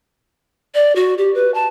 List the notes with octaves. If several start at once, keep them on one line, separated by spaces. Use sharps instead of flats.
D5
F#4
G4
B4
A5